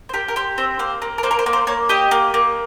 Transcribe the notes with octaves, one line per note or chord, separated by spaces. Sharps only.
C5
G4 A#4
A#4
G4 C5
C4 C5
A#3 C5
A#3
A#4
A#3 C5
A#4
C5
A#3
C5
A#3 C#5
G4 D#5
A#3
A#3